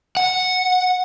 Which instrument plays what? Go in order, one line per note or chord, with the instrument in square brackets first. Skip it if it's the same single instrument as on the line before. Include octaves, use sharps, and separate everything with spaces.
[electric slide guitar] F#5